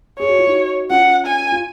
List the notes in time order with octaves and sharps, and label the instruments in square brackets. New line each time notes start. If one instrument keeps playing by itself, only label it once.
[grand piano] G#4 [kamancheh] C#5
[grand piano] F#4
F4
D#4 F#4
[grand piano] C#4 F4 [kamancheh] F#5
[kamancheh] G#5
[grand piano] F4